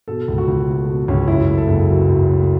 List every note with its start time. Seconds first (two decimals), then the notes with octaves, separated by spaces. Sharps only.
0.08 B2 A4
0.28 C#2
0.38 F#4
0.48 C#2
0.69 A3
0.88 B2
1.08 C#2 C#4
1.28 F#2 E4
1.49 A3
1.58 A4
1.68 F#1
1.89 F#3
2.08 F#2
2.29 A3